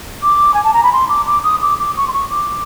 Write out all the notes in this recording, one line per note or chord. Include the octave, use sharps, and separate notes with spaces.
D6
G#5
A5
A#5
B5
C6
D6
D6
D#6
D6
D6
C#6
C6
C#6
D6